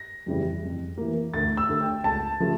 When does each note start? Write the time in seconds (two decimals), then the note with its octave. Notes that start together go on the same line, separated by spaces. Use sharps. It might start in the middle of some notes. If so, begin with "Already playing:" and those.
Already playing: A#6
0.26 F2 C#3 E3 G3
0.63 F2
0.97 E3 A#3
1.33 D2 A6
1.57 E6
1.69 D3 A3
1.81 G5
2.04 C#2 A5
2.40 C#3 F3 A3